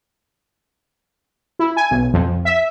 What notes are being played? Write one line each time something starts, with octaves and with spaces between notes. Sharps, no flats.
E4
G#5
B1
F2
E5